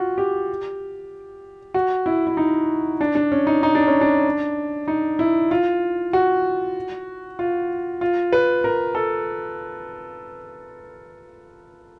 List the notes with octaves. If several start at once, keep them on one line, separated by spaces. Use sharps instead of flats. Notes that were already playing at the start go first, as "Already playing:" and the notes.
Already playing: F4 F#4
G4
F#4
E4
E4
D#4
D4
D4
C#4
D#4
D#4
D4
C#4
D4
D#4
E4
F4
F#4
F4
F4
B4
A#4
A4